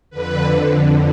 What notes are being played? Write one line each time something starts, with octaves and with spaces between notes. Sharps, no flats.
F2 D3 B4